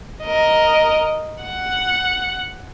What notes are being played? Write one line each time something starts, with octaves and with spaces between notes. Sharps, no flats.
A#4 D#5
F#5